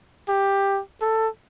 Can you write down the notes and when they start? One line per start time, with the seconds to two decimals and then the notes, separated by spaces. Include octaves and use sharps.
0.29 G4
1.02 A4